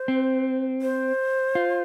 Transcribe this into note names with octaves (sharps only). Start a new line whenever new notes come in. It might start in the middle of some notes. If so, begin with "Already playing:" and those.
Already playing: C5
C4
C5
F4